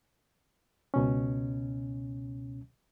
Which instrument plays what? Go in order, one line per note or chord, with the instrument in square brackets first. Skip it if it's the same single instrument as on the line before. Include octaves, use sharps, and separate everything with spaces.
[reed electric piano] C#2 B2 C#4